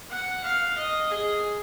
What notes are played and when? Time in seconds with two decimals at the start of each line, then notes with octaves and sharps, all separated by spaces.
0.10 F#5
0.44 F5
0.78 D#5
1.11 G#4